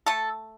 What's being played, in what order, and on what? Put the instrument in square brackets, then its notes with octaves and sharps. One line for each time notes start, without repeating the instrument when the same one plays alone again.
[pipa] A3 A4